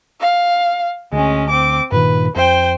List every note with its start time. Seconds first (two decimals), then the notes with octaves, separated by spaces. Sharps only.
0.21 F5
1.12 D2 G#3 C#4
1.50 C4 D6
1.92 G2 A#2 D#3 B4
2.36 F2 C5 G5